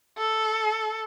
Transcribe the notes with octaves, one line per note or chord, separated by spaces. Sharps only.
A4